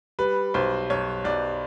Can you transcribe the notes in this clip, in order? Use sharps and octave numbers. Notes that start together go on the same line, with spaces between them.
G3 B4
B1 C5
B1 C#5
B1 D5